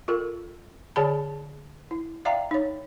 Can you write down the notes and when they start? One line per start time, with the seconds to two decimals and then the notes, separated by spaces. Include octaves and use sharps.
0.08 F4 A4 A#4
0.96 D3 G#4 C#5 D5 A5 B5
1.91 E4
2.25 D5 E5 F5 G5 A#5
2.51 D#4 C#5